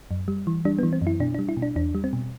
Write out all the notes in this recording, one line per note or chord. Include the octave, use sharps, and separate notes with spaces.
F#2
G3
E3
G3 D4
B3
E3
C4
F#2
E4
B2 D4
D4
G3
E4
B2
D4
E2 D4
G3
C4
B2